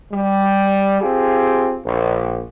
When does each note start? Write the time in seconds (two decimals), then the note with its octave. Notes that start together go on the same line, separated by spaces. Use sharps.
0.12 G3
1.00 C4 F4 G4 G#4
1.85 A#1